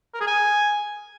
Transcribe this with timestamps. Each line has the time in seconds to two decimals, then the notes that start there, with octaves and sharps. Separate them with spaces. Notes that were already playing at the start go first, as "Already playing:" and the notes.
0.14 A#4
0.20 G#4
0.27 G#5